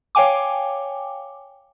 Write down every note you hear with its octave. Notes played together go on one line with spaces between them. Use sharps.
C#5 F5 G5 G#5 D6